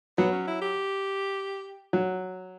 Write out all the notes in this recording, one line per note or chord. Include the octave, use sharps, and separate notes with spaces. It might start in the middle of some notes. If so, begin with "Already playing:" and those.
F#3 B3
C#4
E4
G4
F#3